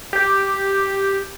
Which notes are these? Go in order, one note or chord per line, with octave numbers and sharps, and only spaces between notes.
G4